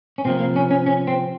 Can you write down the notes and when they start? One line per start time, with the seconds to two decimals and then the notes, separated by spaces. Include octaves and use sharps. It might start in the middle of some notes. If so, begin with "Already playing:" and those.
0.18 C#4
0.25 C3 F3 A#3 C4
0.40 A#3
0.56 C#4
0.71 C#4
0.86 C#4
1.07 C4